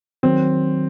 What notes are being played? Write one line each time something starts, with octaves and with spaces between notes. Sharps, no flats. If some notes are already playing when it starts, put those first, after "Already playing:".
D#3 F#3 C4